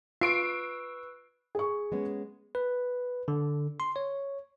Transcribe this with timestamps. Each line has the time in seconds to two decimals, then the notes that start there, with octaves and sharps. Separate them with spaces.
0.21 F4 B4 C#6 E6 C7 D7
1.55 G#4 C#6
1.92 G#3 B3 C#4
2.55 B4
3.28 D3
3.80 C6
3.96 C#5